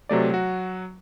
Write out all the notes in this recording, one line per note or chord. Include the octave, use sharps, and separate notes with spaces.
C3 F#3 A3 D5
F#3 F#4